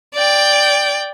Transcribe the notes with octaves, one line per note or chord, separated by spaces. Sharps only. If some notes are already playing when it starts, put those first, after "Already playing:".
D5 G5